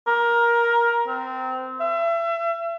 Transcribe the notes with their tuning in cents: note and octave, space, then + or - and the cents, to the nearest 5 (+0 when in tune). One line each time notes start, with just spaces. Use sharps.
A#4 +15
C4 -20
E5 +35